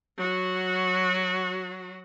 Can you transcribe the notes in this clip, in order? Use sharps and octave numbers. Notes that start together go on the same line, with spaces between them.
F#3 F#4